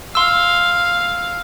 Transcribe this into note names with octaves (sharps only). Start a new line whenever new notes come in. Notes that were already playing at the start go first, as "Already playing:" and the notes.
F5 C6 E6